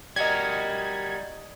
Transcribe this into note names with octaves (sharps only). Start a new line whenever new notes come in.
G3 F#4 A#4 D5 D#5 G#6